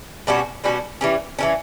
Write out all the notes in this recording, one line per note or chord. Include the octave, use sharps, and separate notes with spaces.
B2 G3 C#4 F#4
B2 G3 C#4 F#4
E3 G3 C#4
E3 G3 C#4